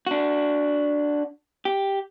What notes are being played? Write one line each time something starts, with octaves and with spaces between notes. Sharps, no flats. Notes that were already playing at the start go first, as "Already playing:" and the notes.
D4 F#4
G4